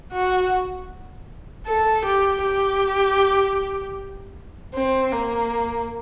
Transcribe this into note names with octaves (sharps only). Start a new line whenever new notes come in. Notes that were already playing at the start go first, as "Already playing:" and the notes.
F#4
A4
G4
G4
C4
A#3